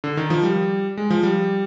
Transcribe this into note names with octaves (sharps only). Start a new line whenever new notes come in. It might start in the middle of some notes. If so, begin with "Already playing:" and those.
D3
D#3
F3
G3
G#3
F3
G3